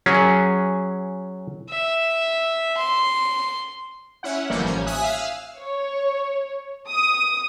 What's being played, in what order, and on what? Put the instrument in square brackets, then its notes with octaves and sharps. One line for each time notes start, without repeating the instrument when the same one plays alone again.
[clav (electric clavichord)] F#3 C#4 G#4 C#5
[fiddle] E5
C6
[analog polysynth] C#4 E4 F#5
G1 D#3 F3 G3 A#3 G6
A1 C#4 G#6
E5 G#5 D#6 F#6 B6
F5 E6 F6
[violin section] C#5
D#6